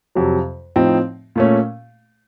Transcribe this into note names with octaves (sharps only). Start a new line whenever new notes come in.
F2 C3 F#3
A2 F3 C4 D#4
A#2 A3 C#4